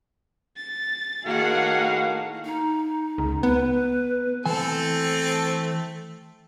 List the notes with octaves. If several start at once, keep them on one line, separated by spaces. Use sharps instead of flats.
A6
A2 D#3 A#3 F#4 G#4 F5 F#5
D#4
C#2
B3 B4
E3 A3 C4 A4 G#5